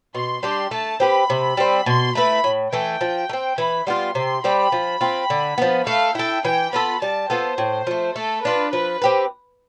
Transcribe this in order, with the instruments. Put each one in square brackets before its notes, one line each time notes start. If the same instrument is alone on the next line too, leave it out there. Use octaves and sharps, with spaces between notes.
[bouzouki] B2 [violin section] C6
[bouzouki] G3 D4 G4 [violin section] C6
[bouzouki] A3 [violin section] A5
[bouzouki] C4 G4 B4 [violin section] B5
[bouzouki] C3
G3 C4
[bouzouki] B2 [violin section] C6
[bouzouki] A3 E4 B4 [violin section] B5
[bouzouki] A2
[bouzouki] E3 A3 [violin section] G5
[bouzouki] F3
A3
C4
[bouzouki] E3 [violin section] B5
[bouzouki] G3 B3 F4 [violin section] C6
[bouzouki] C3 [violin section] C6
[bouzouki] G3 C4 G4 [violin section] B5
[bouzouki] F3
C4 F4
D3
F3 B3
[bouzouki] A3 [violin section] F5
[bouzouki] E4 A4 [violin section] G5
[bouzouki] E3 [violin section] G5
[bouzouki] B3 F4 A4 [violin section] B5
[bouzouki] G3 [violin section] A5
[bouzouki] B3 F4 A4 [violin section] C5
[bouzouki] A2
F3 A3
[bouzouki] A3 [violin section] A4
[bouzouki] D4 F4 [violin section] B4
[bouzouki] F3 [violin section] B4
[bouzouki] C4 G4 B4